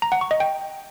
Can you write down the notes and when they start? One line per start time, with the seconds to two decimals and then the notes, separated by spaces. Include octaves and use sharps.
0.02 A#5
0.12 F#5
0.21 C#6
0.31 D#5
0.40 G5